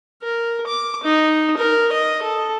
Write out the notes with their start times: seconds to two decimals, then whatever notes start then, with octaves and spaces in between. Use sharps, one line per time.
0.23 A#4
0.67 D6
1.04 D#4
1.58 A#4
1.93 D#5
2.23 A4